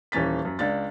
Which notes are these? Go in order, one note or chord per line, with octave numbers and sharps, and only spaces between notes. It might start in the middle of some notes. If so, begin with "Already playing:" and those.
D#1 E3 C#4 A6 B6
F#2
C#2 D4 A6